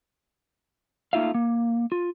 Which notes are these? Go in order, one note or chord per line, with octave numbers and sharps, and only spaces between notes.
A3 A#3 D#4 F4 E5 F5
A#3
F4